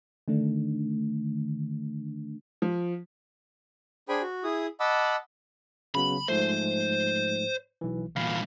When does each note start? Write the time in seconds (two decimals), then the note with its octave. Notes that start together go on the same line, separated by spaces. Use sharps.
0.28 D3 D#3 A3 D4
2.62 F3
4.09 D4 G#4 C5 G5 G#5 B5
4.22 F#4
4.44 E4 G#4 D#6
4.80 D#5 F#5 A5 B5 D6 E6
5.95 C#3 F#3 B3 B5
6.28 G#2 F3 A3 C5
7.81 B1 E3
8.16 E2 A#2 F5 B5